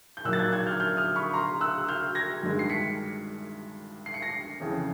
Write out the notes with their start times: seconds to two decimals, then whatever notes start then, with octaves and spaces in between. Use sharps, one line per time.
0.17 G6
0.25 A#2 F#3 A#3 D#4 E6 F#6
0.33 A6
0.39 F#6 G#6
0.52 F#6 G#6
0.66 F6 G6
0.80 F6 G6
0.97 D#6 F6
1.16 B5 C#6
1.33 A#5 C6
1.61 E6 F#6
1.89 F6 G6
2.15 G#6 A#6
2.43 G2 D#3 G#3
2.59 C7
2.69 B6 C#7
4.06 C7
4.14 C#7
4.22 A#6 C7
4.60 F2 C#3 E3